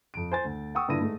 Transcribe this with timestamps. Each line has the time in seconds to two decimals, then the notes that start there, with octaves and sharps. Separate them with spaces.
0.14 F2 D7
0.32 C5 G#5 A6
0.45 D2
0.75 F#5 G5 C#6 D#6 E6
0.88 G2 A#2 D3 E4 A#6 D#7
1.01 G#2 A3